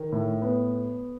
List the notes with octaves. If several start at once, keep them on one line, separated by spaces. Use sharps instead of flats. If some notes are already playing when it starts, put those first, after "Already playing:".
Already playing: D#3
A2
B3